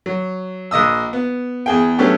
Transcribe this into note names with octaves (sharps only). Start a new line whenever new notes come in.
F#3
A#1 D#5 D#6 E6
B3
E2 G#4 G5
F#3 A3 B3 C#4 D4 G4